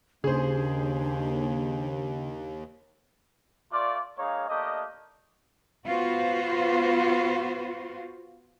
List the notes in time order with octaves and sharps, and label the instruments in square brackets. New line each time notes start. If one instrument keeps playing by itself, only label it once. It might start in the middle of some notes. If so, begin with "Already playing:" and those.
[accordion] D#2 [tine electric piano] C#3 [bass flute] D4 [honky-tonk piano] G#4 C5
[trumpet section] A3 F4 D5
G#3 A#3 D#4 G#4 C#5 F5
A3 A#3 D4 G4 D#5
[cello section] B3 F4 F#4 C5